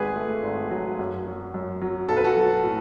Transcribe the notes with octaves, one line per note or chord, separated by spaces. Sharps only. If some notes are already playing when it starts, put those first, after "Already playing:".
Already playing: G#1 G#3 G#4 B4
A3
G#1
F#3
F#2
F#3
F#2
F#3
B1 A4
B4
F#4 A4
F#3
A2